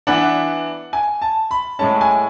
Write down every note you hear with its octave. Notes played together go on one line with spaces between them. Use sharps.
E3 B3 D4 F#5
G#5
A5
B5
A2 G#3 C#4 A5
G#5